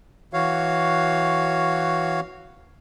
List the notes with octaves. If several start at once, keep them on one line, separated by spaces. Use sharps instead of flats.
E3 F#4 C#5 F5